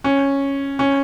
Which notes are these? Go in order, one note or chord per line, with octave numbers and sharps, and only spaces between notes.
C#4
C#4